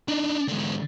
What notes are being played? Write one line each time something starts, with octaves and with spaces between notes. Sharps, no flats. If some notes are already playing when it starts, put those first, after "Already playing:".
D4 D#4
G#2 D3